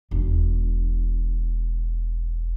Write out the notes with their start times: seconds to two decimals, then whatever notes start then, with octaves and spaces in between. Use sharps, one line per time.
0.11 E1 D4